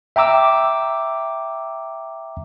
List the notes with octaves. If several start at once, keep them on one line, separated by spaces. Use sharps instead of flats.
E5 G5 A#5 D6 E6